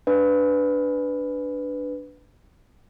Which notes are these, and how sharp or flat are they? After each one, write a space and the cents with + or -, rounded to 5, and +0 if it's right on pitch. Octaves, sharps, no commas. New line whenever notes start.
D4 +0 B4 +10